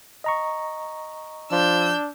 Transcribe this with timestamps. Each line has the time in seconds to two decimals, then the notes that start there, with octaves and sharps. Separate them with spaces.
0.24 D#5 A#5 C#6
1.51 F3 D4 E6 G6